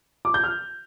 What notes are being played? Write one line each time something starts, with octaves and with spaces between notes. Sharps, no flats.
D6
G6
F6